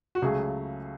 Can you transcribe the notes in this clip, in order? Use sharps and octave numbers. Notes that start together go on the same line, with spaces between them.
F#4
C#2 C#3 F#3 A3 G#4